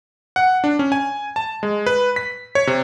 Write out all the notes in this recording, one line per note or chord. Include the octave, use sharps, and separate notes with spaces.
F#5
D4
C#4
G#5
A5
G#3
B4
B6
C#5
C3